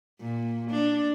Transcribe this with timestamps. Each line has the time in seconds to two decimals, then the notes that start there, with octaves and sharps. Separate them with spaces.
0.21 A#2
0.71 D4